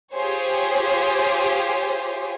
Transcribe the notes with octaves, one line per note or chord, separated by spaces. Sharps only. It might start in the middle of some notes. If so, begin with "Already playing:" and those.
F4 G4 G#4 C5 C#5